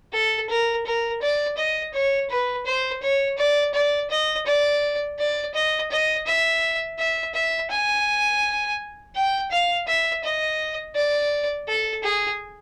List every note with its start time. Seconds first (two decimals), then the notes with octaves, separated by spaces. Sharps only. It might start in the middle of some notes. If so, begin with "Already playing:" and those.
0.13 A4
0.49 A#4
0.86 A#4
1.22 D5
1.57 D#5
1.93 C#5
2.30 B4
2.66 C5
3.02 C#5
3.38 D5
3.74 D5
4.11 D#5
4.46 D5
5.19 D5
5.54 D#5
5.91 D#5
6.26 E5
6.98 E5
7.34 E5
7.70 G#5
9.15 G5
9.51 F5
9.87 E5
10.24 D#5
10.95 D5
11.68 A4
12.03 G#4